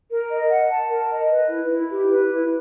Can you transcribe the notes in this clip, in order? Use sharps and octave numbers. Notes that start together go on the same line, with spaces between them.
A#4
D#5
F#5
A5
A#4
D#5
B4
E4
E4
G4
B4
E4